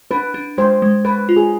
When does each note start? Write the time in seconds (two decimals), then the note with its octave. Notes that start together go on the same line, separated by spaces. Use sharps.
0.11 D4 B4
0.34 D4
0.58 G#3 C5
0.82 G#3
1.05 D4 B4
1.29 F4
1.36 G#4